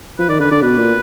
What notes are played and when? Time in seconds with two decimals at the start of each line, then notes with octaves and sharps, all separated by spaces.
0.19 F3 B4
0.29 D#3 D5
0.40 D3 B4
0.51 D3 D5
0.62 B2 B4
0.78 A#2